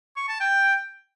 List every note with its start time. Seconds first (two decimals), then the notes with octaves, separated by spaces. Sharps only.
0.17 C#6
0.29 A5
0.41 G5